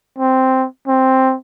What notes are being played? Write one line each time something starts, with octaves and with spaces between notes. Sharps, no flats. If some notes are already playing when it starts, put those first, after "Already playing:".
C4
C4